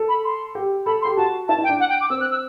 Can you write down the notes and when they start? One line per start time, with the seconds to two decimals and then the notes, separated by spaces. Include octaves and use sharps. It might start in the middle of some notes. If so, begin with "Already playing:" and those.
Already playing: A4
0.08 B5
0.24 C6
0.55 G4
0.86 A4 B5
1.02 C6
1.05 G4
1.17 F#4 A5
1.48 E4 A5
1.58 E4
1.64 G5
1.69 D4
1.80 F#5
1.89 G5
2.01 D6
2.10 C4 E6
2.21 F#6
2.31 E6